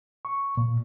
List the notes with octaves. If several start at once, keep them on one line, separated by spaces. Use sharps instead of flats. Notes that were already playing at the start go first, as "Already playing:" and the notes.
C#6
A#2